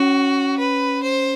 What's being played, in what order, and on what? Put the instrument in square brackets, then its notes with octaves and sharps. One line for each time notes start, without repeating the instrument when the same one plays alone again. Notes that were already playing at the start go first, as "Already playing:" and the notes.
Already playing: [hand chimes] C#4 [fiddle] F#4
[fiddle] B4
C5